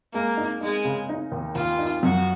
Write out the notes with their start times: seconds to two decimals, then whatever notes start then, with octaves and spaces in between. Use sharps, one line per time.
0.13 G#3 A#3
0.37 D#4
0.61 G#3 D#4
0.85 C#3
1.09 D#4
1.32 D#2
1.55 D#2 F4
1.79 D#4
2.03 F#2 F#4